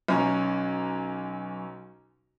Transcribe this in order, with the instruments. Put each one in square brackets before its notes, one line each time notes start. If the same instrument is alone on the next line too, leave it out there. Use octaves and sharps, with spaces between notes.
[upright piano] B1 C#4 A#5